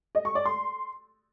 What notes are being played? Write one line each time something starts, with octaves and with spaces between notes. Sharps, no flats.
D#5
C#6
D5
C6